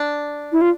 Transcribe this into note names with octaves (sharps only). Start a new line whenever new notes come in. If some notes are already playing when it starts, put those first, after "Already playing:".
Already playing: D4
E4
F4